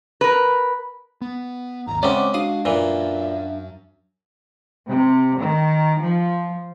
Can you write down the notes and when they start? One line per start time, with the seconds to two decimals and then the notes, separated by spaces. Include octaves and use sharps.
0.21 A#4 B4
1.21 B3
1.87 G#1 D#2 A#5
2.03 C#3 G#3 C4 D5 E5 F#5 D6
2.34 D4 F#4 F5 D#6
2.65 F#2 A#2 E3 E5
4.87 C3
5.38 D#3
6.01 F3